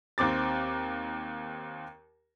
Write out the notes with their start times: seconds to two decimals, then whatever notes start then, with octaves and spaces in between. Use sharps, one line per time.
0.18 D#2 C4 D6 A6